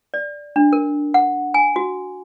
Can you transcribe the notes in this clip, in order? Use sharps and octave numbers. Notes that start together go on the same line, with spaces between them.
D5
D4
A#4
F#5
G#5
F#4